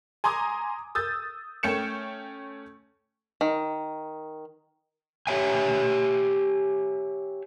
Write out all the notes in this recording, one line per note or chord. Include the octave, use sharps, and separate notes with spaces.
G#5 A#5 C6 D6 D#6 G#6
D#6 E6 G6 A6
A3 C#4 G5 C#7 E7
D#3
G4 C#5 E5 G#5